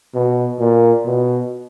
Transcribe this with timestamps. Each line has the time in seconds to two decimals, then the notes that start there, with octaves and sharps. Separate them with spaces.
0.14 B2
0.60 A#2
1.05 B2